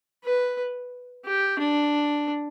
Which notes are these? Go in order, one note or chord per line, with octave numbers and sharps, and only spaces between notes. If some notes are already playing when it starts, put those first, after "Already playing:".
B4
G4
D4